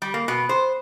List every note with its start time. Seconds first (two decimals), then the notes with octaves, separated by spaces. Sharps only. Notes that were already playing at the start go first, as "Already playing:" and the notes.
0.02 G3
0.14 A#3
0.28 B2
0.49 C5